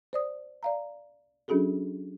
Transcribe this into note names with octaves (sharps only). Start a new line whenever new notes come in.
C5 D5 D#6
D5 F5 A#5
F#3 C#4 D4 F#4 G#4 A4